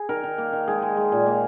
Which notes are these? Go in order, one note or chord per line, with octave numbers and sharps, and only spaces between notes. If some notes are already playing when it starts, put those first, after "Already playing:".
Already playing: G#4
D#3 A#4
D#3
A#3
D#3
G#3 G#4
G#3
G#3
A#2
A#3